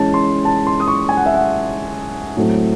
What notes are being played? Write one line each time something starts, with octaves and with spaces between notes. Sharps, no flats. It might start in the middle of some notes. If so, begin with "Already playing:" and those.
Already playing: E3 G#3 C#4 A5
C6
A5
C6
D#6
C#6
G#5
F#5
E5
F#5
A2 F#3 A3 C4